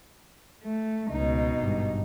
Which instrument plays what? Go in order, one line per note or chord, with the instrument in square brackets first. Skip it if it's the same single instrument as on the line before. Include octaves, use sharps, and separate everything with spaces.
[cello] A3
[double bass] C#2 [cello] B2 D#4
[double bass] G#1 G2